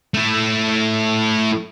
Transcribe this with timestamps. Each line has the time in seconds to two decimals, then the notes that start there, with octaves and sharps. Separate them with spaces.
0.14 A3 E4